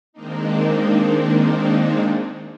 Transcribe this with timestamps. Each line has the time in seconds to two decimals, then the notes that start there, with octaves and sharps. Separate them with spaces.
0.13 D#3 G#3 A#3 C4 D4 D#4